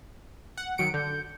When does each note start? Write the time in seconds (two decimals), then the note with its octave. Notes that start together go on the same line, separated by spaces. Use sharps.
0.57 F#5
0.78 D#3 F#3 C#7 D7
0.94 D3 G6